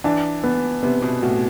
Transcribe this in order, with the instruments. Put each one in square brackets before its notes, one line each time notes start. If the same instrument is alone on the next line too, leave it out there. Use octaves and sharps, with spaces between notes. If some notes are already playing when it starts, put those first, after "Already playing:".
[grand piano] E3 [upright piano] D4
[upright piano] B3
[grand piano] C3 [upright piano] B3
[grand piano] B2
[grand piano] A2 [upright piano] F#4